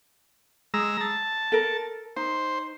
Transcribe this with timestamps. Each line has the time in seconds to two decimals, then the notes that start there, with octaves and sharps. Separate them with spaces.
0.74 G#3 A#5 E6
1.01 A5
1.52 A4 A#4
2.16 D#4 C5